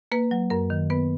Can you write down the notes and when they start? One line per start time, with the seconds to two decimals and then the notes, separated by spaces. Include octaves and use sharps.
0.12 A#3 B4
0.31 F#3
0.50 F#2 A#4
0.70 D#3
0.90 B3 B4